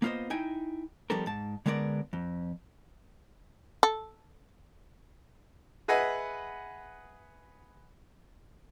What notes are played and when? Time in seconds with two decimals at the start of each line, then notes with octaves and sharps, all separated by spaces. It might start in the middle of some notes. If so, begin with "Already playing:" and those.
0.02 A#3 B3 F4 A#4 C5 D#5
0.30 D#4 E4 G5 G#5
1.10 F3 G3 B3 D4 A4 A#4
1.26 G#2 A5
1.66 D3 G#3 B3 A#4 C#5 D5
2.13 F2
3.83 A4
5.88 G#4 B4 D#5 E5 F#5 G#5